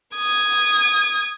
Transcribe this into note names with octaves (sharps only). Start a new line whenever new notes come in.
D#6 G#6